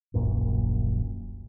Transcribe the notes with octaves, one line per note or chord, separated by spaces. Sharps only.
D#1 A#1 F#2 A#2